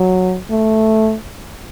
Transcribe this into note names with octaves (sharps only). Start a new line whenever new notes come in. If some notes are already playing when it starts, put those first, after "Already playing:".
Already playing: F#3
A3